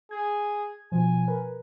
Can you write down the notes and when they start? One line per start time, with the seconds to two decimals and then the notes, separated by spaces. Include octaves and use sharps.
0.11 G#4 G#6
0.92 B2 F3 G#5
1.28 A#4 B4